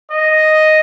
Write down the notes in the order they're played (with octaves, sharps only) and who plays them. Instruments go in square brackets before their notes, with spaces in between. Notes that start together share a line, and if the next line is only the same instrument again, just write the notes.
[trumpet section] D#5